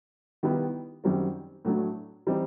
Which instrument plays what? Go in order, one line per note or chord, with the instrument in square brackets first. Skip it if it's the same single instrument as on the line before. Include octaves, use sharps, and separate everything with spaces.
[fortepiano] D#3 G3 B3 E4
F#2 D#3 G3 C4
A2 F#3 A3 D4
E3 G3 C4 D#4